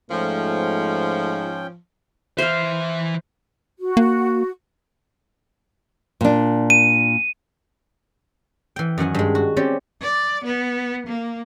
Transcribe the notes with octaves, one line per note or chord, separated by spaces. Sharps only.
G#2 F3 A3 C#4 G5
E3 C5 E5 F5
F#4
A#3
A#2 D4
D#7
E3 G5
F#2 D#3 F#5 G#5
G2 G#3
F#4
C4 C#4 G4 D5
D5
B3
A#3